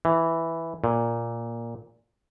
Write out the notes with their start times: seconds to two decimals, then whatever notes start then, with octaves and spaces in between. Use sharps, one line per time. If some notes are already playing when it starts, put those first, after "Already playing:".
0.05 E3
0.84 A#2